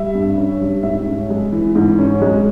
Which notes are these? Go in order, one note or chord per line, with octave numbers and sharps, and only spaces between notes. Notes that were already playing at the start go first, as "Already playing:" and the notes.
Already playing: G3 E5
G2
C#4
G3
G#2 E5
C#4
G#3
E3
G#2
C#4
G#3